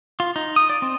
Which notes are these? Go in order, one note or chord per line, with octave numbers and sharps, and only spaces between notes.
F4
D#4
D#6
D5
C4